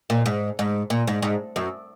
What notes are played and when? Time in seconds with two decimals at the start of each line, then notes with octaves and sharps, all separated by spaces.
0.10 A#2
0.26 G#2
0.59 G#2
0.90 A#2
1.07 G#2
1.22 G#2
1.56 F#2